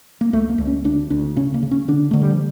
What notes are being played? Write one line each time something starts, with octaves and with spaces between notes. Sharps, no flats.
A#3
C#2 A3
A#3
C#2
C#4
D2 D4
D2 D4
C#3 C#4
A#3
C#3
C#4
D3 D4
D3 A3
G3
F3